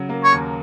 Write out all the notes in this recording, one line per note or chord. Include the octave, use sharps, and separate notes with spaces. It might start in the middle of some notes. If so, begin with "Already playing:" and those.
Already playing: C#3 F#3
A#3
C#5
D#2